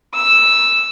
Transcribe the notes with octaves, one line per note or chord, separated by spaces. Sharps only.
E6